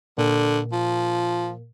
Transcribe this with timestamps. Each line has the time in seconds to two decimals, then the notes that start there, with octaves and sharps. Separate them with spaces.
0.18 A#2 D3
0.72 F3